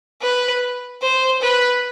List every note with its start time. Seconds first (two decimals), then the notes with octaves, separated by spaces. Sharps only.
0.22 B4
1.02 C5
1.42 B4